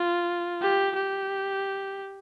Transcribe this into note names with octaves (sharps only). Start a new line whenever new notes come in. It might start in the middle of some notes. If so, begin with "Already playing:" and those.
Already playing: F4
G4
G4